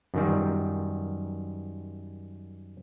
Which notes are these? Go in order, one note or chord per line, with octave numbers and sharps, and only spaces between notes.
F#2 D#3 G3